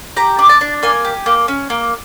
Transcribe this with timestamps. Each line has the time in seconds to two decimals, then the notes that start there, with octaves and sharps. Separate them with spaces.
0.16 G4 A#5
0.39 D4
0.49 A5
0.61 D4
0.83 A#3 G#5
1.05 G4
1.26 A#3
1.48 C#4
1.70 A#3